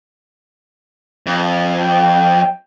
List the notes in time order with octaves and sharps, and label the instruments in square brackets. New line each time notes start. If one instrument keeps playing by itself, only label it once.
[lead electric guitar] F2
[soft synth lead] G5